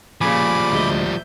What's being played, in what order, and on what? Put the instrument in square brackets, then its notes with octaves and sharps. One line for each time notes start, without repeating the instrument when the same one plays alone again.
[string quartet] A#2 C#3 [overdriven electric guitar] F3 G3 [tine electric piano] G#5 [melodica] B5 D6
[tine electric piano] D2 G#3 [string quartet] E5 G6